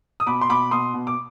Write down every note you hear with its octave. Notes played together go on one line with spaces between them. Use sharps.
D#6
B2 B5 D6
C6
B2 B5 D6
B2 C6 D#6
B2
D6